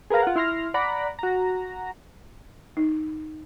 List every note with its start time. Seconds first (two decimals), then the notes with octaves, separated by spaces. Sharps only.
0.10 G#4 A#4 B4 F5 A#5
0.22 F4 F#5
0.36 E4 C6 F6 A#6
0.74 D5 F#5 A#5 B5
1.19 F#4 A#5
2.77 D#4